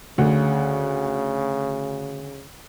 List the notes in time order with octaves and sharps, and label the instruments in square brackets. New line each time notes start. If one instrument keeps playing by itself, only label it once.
[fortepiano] D2 [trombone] C#3